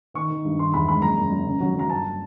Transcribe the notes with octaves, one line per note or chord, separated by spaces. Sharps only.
D#3 C#6
D#3
G2
D#3 C6
E2 B5
G#3 B5
F#1 A#5
F#1
F#1
C#3
F#3
F#3 A#5
G1 A5